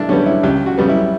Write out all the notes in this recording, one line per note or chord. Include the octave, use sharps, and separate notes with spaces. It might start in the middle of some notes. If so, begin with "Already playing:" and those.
Already playing: G2 D4 E4
D3 G3 B3 C#4
E4
C#2 G4
F#4
C#3 G3 B3
E4